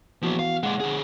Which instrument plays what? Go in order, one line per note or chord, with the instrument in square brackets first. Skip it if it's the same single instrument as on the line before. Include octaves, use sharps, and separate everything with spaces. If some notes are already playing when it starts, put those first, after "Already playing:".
[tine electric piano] E3 B3 F#4 [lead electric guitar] F3 A#3
[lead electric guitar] F5
[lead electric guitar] A#2 G#3 [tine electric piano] F#5
[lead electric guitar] D3 G#4